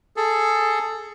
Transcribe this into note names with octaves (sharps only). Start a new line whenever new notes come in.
G#4 A4